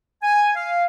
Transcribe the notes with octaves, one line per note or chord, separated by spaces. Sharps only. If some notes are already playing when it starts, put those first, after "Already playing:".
G#5
F5